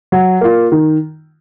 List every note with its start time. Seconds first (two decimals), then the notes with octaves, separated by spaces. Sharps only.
0.12 F#3
0.41 A#3 F4
0.72 D#3